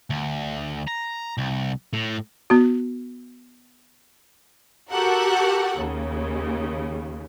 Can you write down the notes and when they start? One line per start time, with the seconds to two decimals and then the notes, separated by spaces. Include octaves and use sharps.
0.10 D2
0.88 A#5
1.38 C2
1.93 A2
2.50 B3 F#4
4.90 F#4 G4 A4 A#4 F#5
5.78 D#2 C#3